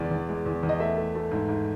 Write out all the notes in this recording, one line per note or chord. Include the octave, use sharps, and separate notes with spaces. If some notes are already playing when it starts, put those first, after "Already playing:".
Already playing: E2 G#3 D5
E2
G#3
E2
E2
D#5
A3 E5
A3
A3
G#2
G#2